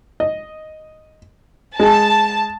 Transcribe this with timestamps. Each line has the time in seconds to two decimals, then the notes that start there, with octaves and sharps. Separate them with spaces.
0.20 D#5
1.80 G#3 A5